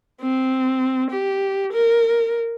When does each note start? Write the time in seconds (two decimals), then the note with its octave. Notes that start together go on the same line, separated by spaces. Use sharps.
0.21 C4
1.11 G4
1.72 A#4